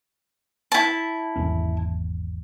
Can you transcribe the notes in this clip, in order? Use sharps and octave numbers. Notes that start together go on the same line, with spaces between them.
E4 A5
G#1 E2 C#4